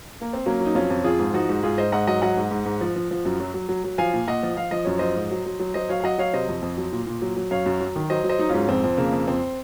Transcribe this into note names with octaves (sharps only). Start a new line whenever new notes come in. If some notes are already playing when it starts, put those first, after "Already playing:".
A#3
C4
F#3 A#3 C#4
F#3
D#4
F2 C#4 F4
F2
F3 F4 G#4
G#2
F3 D#4 F#4
G#2
G#2 F4 G#4
G#2 C5 D#5
G#2 D#5 F#5
F#3 D#5 F#5
F#3 D#5 F#5
G#2
G#2
G#2
F3
F3
F3
F#2
F#3
F#3
F#3
F#3
F3 F5 G#5
A#2
A#2 D#5 F#5
F3
F3 F5
F3 D#5
F#2 C#5
F3 C5 D#5
G#2
F#3
F#3
F#3
F#3 C5 D#5
F#3 C#5 F5
F5
F#3 D#5 F#5
F#3 C#5 F5
C3 C5 D#5
F2
F2
F#3
A#2
A#2
F#3
F#3
F#2 C#5 F5
F#2
F#3
D#3
F#3 C5 D#5
F#3
C5 D#5
F#3 D#4
G#2 C#4 F4
F2 C4
F2
C#3 A#3
F2
F2 C4